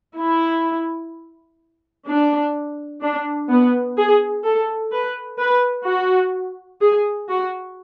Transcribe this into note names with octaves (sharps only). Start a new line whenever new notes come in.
E4
D4
D4
B3
G#4
A4
B4
B4
F#4
G#4
F#4